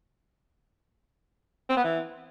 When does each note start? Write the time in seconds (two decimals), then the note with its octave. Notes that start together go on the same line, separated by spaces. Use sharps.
1.70 C4
1.77 B3
1.84 E3